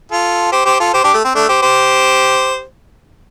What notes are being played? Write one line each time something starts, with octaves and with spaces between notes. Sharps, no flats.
F4 A4
G4 C5
G4 C5
F4 A4
G4 C5
D4 G4
A3
C4
A3 D4
G4 C5
G4 C5